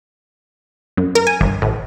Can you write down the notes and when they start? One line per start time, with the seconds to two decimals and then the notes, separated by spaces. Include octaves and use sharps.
0.97 F#2
1.15 A#4
1.27 G#5
1.41 G1
1.62 A1